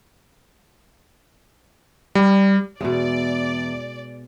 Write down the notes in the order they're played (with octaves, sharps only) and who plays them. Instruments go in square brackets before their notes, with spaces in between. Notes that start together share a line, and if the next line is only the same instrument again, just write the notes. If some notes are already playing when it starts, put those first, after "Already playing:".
[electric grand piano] G3
[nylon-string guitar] E2 [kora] B2 G#3 [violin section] D5